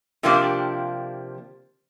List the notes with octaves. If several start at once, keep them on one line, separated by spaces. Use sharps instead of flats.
C3 F3 A#3 D4 G4